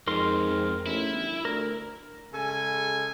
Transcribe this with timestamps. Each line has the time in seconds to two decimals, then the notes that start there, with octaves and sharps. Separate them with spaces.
0.07 F2 G#2 A#4 C6
0.86 A1 E4
1.12 G1
1.45 D2 A#4
2.33 C#3 G#3 A4 G#5